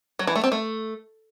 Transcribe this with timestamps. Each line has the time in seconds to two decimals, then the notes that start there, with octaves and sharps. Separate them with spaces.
0.19 F#3
0.27 E3
0.35 A3
0.44 C4
0.52 A3